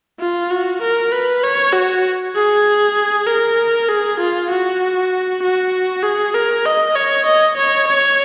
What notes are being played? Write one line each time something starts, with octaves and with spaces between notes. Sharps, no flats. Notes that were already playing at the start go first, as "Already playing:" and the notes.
F4
F#4
A#4
B4
C#5
F#4
G#4
A#4
G#4
F4
F#4
F#4
G#4
A#4
D#5
C#5
D#5
C#5
C#5